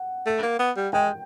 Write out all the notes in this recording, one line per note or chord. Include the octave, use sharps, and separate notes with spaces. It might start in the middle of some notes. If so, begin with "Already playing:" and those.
Already playing: F#5
A3
A#3
B3
G3
G#3 G5